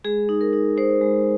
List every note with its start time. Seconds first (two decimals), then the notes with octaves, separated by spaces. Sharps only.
0.04 G#3 G#4
0.29 D#4
0.41 A#4
0.53 D#4
0.77 D#4 C5
1.01 G#3